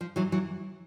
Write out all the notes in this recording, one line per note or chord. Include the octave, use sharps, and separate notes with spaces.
F3
E3 F#3
E3 F#3